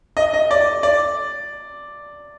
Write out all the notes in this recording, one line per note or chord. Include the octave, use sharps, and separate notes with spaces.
D#5
D#5
D5
D5